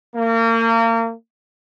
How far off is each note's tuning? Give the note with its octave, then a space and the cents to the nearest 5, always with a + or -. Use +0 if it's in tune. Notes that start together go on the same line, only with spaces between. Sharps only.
A#3 -35